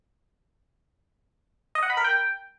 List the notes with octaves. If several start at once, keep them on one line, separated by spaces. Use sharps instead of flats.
D#5
F#5
B5
A#4
G5